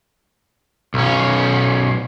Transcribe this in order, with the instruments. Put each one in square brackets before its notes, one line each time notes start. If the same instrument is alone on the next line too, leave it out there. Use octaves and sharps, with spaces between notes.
[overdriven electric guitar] B1 C#4